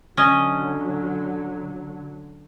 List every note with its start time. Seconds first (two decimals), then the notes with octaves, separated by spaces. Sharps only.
0.17 D3 F#3 C#4 D#5